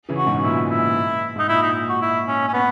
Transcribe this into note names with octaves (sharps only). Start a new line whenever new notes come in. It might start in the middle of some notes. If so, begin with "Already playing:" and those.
C#3 E3
F#4
G#2 B2
A#2 E4
E4
G#2 D#4
A#2 E4
D#4
F#4
E4
C#4
C#4
B3